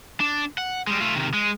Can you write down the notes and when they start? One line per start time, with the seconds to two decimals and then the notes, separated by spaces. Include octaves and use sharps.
0.20 D4
0.58 F#5
0.87 G3 G#3
1.00 A3 F4
1.15 C3 D#3
1.34 G#3